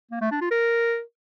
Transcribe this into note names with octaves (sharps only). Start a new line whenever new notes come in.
A#3
A3
D4
F4
A#4